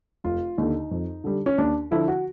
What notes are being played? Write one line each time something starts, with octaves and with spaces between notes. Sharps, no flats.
F1 F4
D#2 D3 D#4
F2
D3 G3
C#4
D#2 D4
D3 F3 E4
F#4